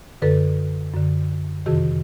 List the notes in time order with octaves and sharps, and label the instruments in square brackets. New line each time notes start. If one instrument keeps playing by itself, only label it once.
[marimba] F#2 D3 A4 B4
F#2 D3
F2 C3 D#3 F#4 G#4